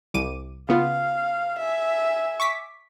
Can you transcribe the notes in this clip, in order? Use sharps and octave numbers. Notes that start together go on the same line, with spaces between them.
C2 D6 D#7
C#3 B3 F4 F5
E5 G#5
C#6 D6 B6